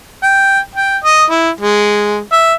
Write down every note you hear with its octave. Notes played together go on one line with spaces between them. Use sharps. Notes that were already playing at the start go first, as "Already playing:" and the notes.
G5
G5
D#5
E4
G#3
E5